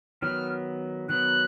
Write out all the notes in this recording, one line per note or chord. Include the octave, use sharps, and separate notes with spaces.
D#3 F#3 B3 F6
D#3 F#3 B3 F#6